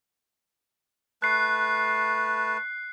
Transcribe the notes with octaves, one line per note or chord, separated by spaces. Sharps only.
A3 B4 A5 F#6 C7